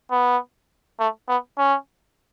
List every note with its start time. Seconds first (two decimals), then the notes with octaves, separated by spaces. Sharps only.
0.11 B3
0.99 A3
1.28 B3
1.58 C#4